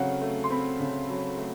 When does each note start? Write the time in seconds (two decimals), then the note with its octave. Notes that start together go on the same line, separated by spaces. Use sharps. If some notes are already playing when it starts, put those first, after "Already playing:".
Already playing: C#3 F#3 A3 C4 F5 F#5
0.21 A3
0.44 C6
0.50 C4 B5
0.80 C#3
1.09 F#3
1.37 A3